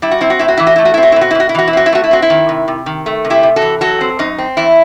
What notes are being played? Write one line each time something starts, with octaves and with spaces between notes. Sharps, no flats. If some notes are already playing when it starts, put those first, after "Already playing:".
G3 E4
F#4
C4 E4
F#4
A2 E4
F#4
E3 E4
F#4
A3 E4
F#4
C4 E4
F#4
B2 E4
F#4
E4
B2 F#4
E4
E3 F#4
E4
C4 F#4
E4
A3 F#4
E4
C4 F#4
E4
D#3
C3
C3
D#3
A3
C3
E4 G4
C3
F#4 A4
E3
F#3 F#4 A4
C4
F#2 D#4
C4
E2 E4